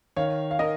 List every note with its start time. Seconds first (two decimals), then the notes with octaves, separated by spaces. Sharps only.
0.16 D#3 C#5 F5
0.51 F5
0.59 D#3 A#4 D#5